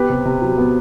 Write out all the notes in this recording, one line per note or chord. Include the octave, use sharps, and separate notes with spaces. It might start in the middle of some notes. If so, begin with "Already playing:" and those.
Already playing: B3 G4 B4
C3
C3
F#3
B3